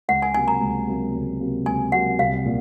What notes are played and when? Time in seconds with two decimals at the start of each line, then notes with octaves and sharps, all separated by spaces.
0.08 C#2 F#5
0.22 G#5
0.34 C3 F#3 A#3 G#5
0.48 A#5
0.61 C#2
0.88 C3 F#3 A#3
1.14 C#2
1.41 C3 F#3 A#3
1.66 C#2 G#5
1.92 C3 F#3 A#3 F#5
2.19 C2 F5
2.46 A#2